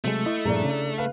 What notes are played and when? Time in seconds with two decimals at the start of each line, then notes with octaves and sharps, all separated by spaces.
0.04 C3 F#3 G#3 A3
0.26 E4 D#5
0.46 G2 A#2 F3 D4 G#4 A#5
0.65 C#3
0.98 B4 F5